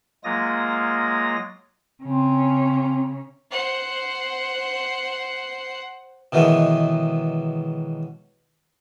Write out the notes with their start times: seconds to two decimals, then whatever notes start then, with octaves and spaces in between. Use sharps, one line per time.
0.24 F#3 G#3 A#3 F4 D#6 A#6
2.02 C#3 C4 C#4
3.51 C5 F#5
6.32 B2 D#3 E3 F#3 G#3 B3